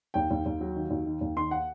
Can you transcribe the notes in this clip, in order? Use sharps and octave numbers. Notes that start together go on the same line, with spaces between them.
D#2 G5
D#2
D#2
F#3
D#3
D#2
D#3
D#2
D#3 C6
F#5